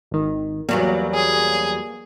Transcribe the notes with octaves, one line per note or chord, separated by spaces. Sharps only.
G#1 D#3
E2 F#3 G3 A#3
G#4